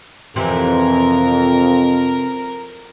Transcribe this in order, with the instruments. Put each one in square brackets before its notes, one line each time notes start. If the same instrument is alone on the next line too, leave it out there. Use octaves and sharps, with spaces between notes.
[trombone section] F2 [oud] C3 E3 C4 [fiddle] A#4